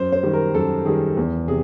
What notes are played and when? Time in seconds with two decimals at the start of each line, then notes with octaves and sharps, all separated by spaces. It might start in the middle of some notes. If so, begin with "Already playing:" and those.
Already playing: F#2 C5
0.12 C5
0.23 D#3 G3
0.33 A#4
0.54 F#2 A4
0.85 D#3 G3 G#4
1.17 E2
1.48 C3 G#4